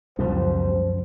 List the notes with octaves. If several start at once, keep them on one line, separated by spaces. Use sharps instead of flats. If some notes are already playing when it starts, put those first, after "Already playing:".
C#2 F#2 B2 F3 G3 C5